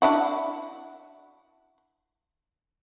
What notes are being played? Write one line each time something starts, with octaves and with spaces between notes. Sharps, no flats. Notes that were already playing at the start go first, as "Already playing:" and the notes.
D4 E4 F#4